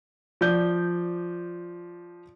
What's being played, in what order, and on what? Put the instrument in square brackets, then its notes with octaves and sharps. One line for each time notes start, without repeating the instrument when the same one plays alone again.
[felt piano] F3 D5 G6